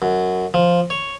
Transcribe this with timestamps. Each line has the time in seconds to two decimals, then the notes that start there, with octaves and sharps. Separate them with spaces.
0.02 F#2
0.54 F3
0.90 C#5